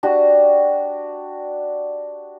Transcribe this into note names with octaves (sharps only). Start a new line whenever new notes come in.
D4 F#4 G4